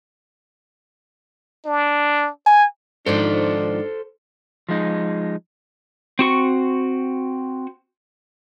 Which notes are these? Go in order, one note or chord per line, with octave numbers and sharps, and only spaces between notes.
D4
G#5
G#2 D#3 F3 D4 A4 C5
F3 G#3 D#4
C4 F#4 C#6